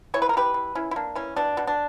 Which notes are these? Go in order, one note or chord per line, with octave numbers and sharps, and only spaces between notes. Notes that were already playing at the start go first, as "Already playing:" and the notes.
E3 C#5
B4
A#4
E3 G4 B4
E3
E3 C#4 E4
E4
A#3 D4
E3 C#4
B2 D4
B2
D4